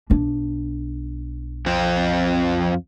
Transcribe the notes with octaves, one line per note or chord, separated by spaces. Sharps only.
B1 D4
F2 C4